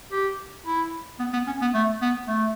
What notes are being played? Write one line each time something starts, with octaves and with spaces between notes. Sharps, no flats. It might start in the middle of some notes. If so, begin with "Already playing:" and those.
G4
E4
B3
B3
C#4
B3
A3
B3
A3